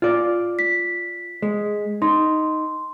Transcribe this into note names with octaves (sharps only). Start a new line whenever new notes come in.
F4 D5
B6
G#3
D#4 C6